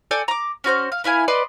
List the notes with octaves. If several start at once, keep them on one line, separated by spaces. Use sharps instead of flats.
A4 D5 G5 G#5
A#5 D6
C#4 F#4 C5 F6
F5
B3 E4 F5 G#5
B4 D5 D#5 C6